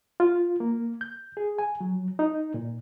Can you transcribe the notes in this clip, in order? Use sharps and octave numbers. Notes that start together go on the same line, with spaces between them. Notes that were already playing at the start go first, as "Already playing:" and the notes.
F4
A#3
G6
G#4
G#5
F#3
D#4
A#2